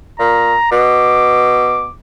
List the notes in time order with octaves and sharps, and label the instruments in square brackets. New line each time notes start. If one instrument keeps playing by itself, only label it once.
[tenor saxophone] A#2 [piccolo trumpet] A#5
[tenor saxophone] B2 [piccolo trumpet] D6